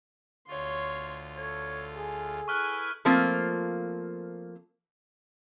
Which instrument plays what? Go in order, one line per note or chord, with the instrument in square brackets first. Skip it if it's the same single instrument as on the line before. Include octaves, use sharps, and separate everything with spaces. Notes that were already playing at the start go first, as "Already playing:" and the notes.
[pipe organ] D2 F4 [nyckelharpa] C#5 C6
[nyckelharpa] A4 [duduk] C#5
[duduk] G#4
[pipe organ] E4 B4 G#5 [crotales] C#6 F6 F#6
[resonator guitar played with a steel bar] F3 A3 A#3 C4 F4